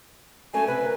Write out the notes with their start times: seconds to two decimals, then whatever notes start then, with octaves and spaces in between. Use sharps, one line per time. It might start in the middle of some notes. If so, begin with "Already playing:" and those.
0.54 F#3 A3 C#4 G#5
0.67 C3 B4
0.81 C#3 A#4